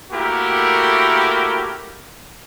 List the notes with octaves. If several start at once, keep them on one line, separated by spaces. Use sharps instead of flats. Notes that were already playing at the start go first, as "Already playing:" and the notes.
A3 A#3 E4 F#4 G4 A#4